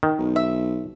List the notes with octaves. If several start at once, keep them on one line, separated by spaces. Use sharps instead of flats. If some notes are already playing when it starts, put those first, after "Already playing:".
D#3
B1
E5